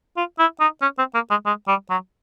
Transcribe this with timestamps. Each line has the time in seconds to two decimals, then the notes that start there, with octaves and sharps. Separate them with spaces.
0.17 F4
0.39 E4
0.60 D#4
0.82 C#4
0.98 C4
1.14 A#3
1.30 G#3
1.46 G#3
1.68 G3
1.90 F#3